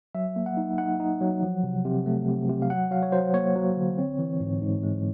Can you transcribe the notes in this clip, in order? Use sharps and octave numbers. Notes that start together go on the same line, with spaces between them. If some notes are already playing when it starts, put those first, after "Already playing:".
F#3 E5
A#3
F#5
D#4
D#4 F#5
D#4
F#3
F3
C3
C3
A3
C3
C3
F5
F#3 F#5
F#3 F5
C#5
F#3 C5
A#3 C#5
F#3
D3
C4
E3
G#2
G#2
G#3